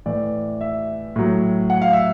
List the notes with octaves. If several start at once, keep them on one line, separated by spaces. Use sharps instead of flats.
A2 E3 D5
E5
A2 F#3
F#5
F5
E5